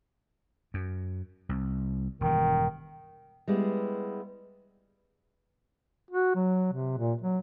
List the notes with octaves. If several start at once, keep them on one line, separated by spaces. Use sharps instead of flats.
F#2
C2
E1 G2 D#3
G3 G#3 B3 E4
F#4
F#3
C3
A#2
F#3